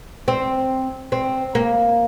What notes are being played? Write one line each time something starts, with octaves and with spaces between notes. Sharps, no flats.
C4
C4
A#3